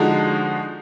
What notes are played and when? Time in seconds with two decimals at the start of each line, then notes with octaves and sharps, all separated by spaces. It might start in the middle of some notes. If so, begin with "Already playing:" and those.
Already playing: D3 F3 G#3 D#4 F#4